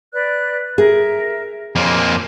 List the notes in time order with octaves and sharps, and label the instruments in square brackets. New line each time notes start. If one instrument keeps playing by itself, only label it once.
[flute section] B4 D5 F#6
[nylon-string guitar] G#4 [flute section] A#4 E5
[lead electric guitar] F2 A#3 [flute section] C#5 G#5 C6